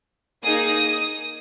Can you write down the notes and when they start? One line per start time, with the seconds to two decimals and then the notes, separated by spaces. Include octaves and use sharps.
0.44 A#3 D#4 G#4 D#6